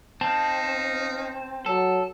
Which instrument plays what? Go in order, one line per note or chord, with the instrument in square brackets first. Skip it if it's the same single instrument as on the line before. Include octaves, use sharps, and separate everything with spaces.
[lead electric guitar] C4 [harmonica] D#4 F5 [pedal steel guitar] A5
[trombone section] F#3 [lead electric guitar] A4